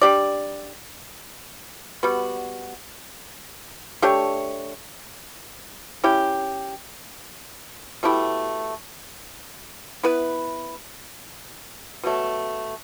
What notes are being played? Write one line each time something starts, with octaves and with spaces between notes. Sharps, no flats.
G3 D4 G4 D5
G3 B3 F#4
A3 D4 G4 C#5
C#4 E4 G4
B2 A3 E4 G4
B3 E4 B4
B2 F#3 A3